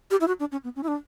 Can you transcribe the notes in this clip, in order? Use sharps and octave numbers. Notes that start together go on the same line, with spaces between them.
G4
E4
F#4
D4
C#4
B3
C#4
E4
D4